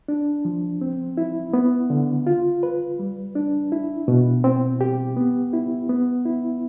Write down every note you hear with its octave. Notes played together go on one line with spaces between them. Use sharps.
D4
F3
C4
E4
B3
D3
F4
B4
G3
D4
E4
B2
C4
G4
B3
E4
B3
E4